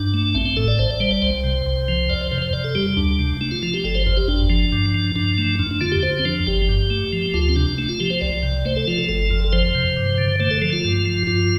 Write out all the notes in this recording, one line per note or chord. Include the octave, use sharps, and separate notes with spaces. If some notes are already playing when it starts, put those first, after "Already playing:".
Already playing: G2 D4
A3
A1 C4
C4
A2 A4
D5
A1 C5
D5
G3 C5
D5
C2 C5
C3
C2
F3
F2 D5
C5
C3 C5
C5
F2 D5
A4
G3 G4
D2 D4
C3
A3 D4
F4
F3 F4
G4
G1 A4
C5
F2 C5
G4
G1 D4
F3
G2
F3
G2 D4
A3
F2 D4
D4
D3 F4
G4
F2 C5
C4
F3 D4
G1 G4
G2
A3
F3
D2 F4
C4
C3 D4
A3 D4
F4
F3 G4
C5
C2 D5
C3
A3 C5
A4
F3 F4
A4
G1 A4
F2
A4
F3 C5
C3
G2
D3
A3 C5
A4
F3 A4
F4
G2
F3
G2 F4